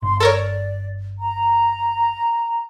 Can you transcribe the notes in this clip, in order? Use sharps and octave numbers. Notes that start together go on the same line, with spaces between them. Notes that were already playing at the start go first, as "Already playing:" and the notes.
G1 C6
A4 A#4 C#5 D5
A#5